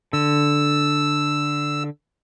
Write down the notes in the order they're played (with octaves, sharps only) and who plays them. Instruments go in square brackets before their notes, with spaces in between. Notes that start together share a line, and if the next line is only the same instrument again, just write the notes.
[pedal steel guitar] D3 [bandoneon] E6